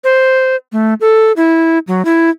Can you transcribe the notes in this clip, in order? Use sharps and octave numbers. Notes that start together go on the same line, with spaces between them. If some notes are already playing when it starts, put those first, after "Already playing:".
C5
A3
A4
E4
F#3
E4